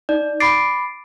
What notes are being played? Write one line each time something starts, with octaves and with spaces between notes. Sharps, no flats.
D#4 D5
B5 D6 A6 C7 D7